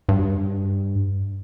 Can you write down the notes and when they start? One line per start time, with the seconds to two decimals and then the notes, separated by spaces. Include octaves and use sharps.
0.09 G2